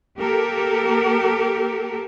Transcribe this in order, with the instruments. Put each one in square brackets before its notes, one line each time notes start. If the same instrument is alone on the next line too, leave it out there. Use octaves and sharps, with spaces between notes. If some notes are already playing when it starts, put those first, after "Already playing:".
[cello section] A#3 G4 A4 A#4